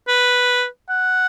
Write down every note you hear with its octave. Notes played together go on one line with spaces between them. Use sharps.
B4
F#5